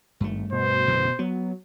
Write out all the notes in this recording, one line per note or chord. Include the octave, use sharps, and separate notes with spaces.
G#1 G2 A3
B2 C5
A1 F#2 D3
F#3 B3